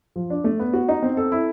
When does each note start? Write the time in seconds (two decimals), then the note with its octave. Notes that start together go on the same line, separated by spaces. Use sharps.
0.16 F3
0.30 D4
0.44 A3
0.59 B3
0.73 F#4
0.89 D#4
1.03 C4
1.17 A4
1.32 E4